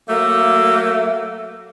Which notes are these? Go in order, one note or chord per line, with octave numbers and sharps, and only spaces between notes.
F#3 A3 A#3